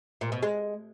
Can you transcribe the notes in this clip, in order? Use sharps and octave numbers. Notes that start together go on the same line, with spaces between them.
A#2
B2
G#3